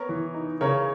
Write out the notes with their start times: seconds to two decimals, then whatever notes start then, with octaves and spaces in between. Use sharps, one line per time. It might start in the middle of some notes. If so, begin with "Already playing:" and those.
Already playing: B3 A#4 C#5
0.09 E3
0.34 D#4
0.61 C#3 A#4 C#5